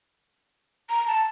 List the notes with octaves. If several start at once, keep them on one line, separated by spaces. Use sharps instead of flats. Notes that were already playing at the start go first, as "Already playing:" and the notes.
A#5
A5